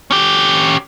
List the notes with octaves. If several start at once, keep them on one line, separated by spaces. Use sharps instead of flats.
C#4 G4